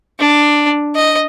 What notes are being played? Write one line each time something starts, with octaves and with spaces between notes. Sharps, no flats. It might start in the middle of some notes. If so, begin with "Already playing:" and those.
D4
D#5